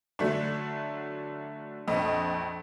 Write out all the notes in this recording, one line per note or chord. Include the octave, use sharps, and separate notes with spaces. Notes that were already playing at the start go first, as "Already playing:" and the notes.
D3 F#3 A3 D4
A#1 F2 D#5